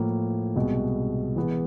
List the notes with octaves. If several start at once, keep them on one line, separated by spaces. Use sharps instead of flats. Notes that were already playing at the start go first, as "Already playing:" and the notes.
Already playing: A2 F3 A#3
C2 B2 G#3
E3 G#3 B3